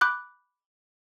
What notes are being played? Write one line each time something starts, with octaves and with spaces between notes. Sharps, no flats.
B5 D6 F#6 G6